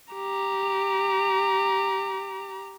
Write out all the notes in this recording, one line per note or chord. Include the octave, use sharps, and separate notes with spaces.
G4 A#5